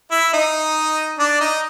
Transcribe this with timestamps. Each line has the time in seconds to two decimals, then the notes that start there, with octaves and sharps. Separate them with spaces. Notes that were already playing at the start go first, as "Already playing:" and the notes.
0.11 E4 E5
0.33 D#4 D#5
1.19 D4 D5
1.40 D#4 D#5